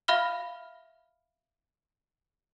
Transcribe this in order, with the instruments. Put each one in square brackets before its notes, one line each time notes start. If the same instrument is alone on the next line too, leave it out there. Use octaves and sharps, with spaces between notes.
[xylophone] E5 F5 B5 F6 G7